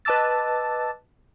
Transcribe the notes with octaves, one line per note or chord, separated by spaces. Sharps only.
B4 D#5 A5 D6 E6 A6